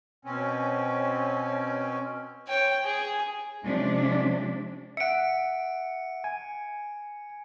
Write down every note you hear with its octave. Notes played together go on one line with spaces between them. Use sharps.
B2 C4 C#4
C#5 G5
G#4
C3 F3 G#3 C#4 D4
E5 F#5 C#7 D7
G#5